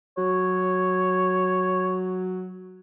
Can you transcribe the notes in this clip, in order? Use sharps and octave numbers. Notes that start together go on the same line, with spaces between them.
F#3 C#5